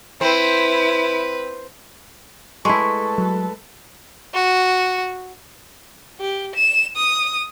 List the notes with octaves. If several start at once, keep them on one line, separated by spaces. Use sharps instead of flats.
C4 E4 B4
G#3 A3 E4 A4 B4 C#6
F#3
F#4
G4
E7
D#6